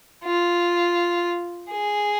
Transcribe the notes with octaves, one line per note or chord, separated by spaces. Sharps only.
F4
G#4